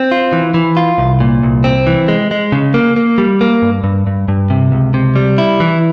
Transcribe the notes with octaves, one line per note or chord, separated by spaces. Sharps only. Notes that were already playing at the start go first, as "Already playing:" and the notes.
Already playing: C4
F4
E3
E3
F4
C2
A#2
C2
C4
E3
G#3
G#3
C#3
A#3
A#3
G3
A#3
G2
G2
G2
G2
C3
C#2
C3
G3
E4
E3